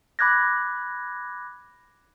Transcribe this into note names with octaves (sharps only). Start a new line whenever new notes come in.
B5 D6 F#6 G#6 A#6